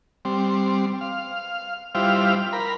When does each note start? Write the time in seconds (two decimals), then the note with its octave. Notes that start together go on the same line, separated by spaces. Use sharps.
0.25 G3 C4
1.01 F5
1.95 G3 E4 F4 C5 F5
2.53 A#4 B5